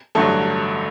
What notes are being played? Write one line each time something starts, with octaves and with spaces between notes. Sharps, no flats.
A1 G2 D3 F#3 A3 A4